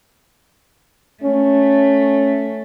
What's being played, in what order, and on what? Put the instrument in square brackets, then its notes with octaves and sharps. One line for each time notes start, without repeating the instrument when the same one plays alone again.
[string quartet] A3 [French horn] C#4